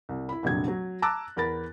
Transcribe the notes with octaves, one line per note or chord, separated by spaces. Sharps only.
C2
E4 B5
F1 A#1 D3 F#3 G#6
F#3
A5 A#5 D6 E6 F#6 A6
E2 A#4 B5 A6